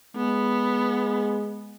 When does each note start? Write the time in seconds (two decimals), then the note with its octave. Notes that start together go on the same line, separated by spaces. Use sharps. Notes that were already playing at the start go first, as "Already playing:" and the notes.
0.16 G#3 B3